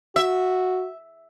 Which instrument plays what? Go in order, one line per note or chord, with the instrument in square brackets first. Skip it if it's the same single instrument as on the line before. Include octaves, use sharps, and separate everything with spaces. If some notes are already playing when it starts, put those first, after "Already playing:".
[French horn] F#4 [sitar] E5